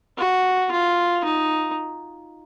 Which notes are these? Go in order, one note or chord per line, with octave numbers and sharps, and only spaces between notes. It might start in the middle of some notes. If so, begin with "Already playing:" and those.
F#4
F4
D#4